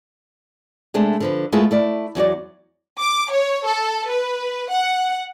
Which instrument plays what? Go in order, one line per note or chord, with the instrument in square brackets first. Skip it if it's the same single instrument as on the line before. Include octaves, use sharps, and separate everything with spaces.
[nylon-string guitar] C3 G#3 A3 D4
D3 F3 B4
G#3 A3 B3 E4 F4 G#4
A3 E4 D5
E2 F#3 F#4 D5
[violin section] D6
C#5
A4
B4
F#5